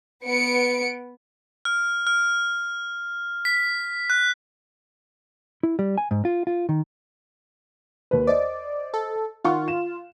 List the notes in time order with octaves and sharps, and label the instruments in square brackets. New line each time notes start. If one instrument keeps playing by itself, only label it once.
[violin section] B3 B4 C#7 D7
[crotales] F6
F6
B6
F#6
[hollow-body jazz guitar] E4
G3
G#5
G#2
F4
F4
D#3
[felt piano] D#2 B4
[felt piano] C5 D#5 [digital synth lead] D5
[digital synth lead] A4
[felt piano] D#3 F#5 C#6 [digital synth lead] F4
[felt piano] E7